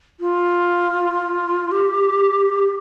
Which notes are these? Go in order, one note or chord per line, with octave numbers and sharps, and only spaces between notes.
F4
G4